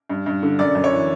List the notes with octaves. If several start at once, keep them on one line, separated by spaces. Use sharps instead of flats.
G2
G2
D3
F#2 D5
F#2
C#5
E3